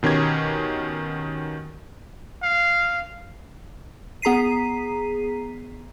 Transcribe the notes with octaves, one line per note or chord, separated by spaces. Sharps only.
B2 D#3 C#4 G4 G#6
F5
B3 G#4 A#5 B6 C7 D#7